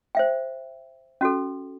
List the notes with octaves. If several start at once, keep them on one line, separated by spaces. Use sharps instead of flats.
C5 E5 G5
C#4 F#4 A4